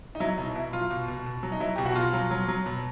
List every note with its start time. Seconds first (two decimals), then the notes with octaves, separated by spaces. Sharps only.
0.15 D#4
0.20 F#3 E4
0.38 B2 D#4
0.55 B2 E4
0.73 F#3 F4
0.91 B2
1.08 B2
1.26 B2
1.43 F#3
1.52 D#4
1.60 F#3 E4
1.76 B2 G4
1.86 F#4
1.96 B2 F4
2.13 F#3
2.31 F#3
2.48 F#3
2.66 B2